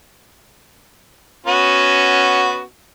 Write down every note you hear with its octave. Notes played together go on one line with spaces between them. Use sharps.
B3 C#4 F#4